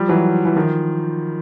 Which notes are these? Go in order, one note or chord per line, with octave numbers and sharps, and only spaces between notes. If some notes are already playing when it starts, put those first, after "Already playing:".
Already playing: F3 G3
E3 F#3
E3
D#3 F3